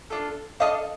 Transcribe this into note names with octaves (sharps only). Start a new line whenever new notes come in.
D4 F4 A4
D4 F4 A4 D#5 F5